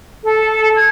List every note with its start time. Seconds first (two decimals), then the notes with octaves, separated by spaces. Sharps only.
0.24 A4
0.76 G#6